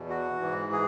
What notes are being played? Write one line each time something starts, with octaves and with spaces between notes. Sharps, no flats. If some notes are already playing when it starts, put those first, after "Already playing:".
Already playing: E2 B2
F#4
G#2 E3
G#4